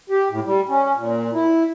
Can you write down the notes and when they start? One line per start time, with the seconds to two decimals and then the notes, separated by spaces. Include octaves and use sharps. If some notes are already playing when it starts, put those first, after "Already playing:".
0.10 G4
0.31 A2
0.45 G3
0.69 C#4
0.96 A#2
1.34 E4